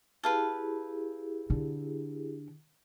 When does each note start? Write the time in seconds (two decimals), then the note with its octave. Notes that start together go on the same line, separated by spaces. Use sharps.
0.24 E4 G4 G#4 B4 F5 A5
1.50 D3